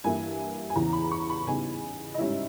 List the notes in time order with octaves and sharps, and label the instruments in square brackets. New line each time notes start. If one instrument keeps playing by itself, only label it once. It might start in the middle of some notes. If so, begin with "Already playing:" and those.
[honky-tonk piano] G2 E3 A#3 E4 G#5
G#5
E2 C#3 E3 A#5
B5
C#6
B5
C#3 G3 B3 D#4 G#5
D#5
G#2 G3 C#4 E4 E5